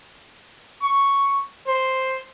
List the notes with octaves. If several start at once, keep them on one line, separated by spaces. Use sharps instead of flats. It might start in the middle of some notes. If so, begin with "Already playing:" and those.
C#6
C5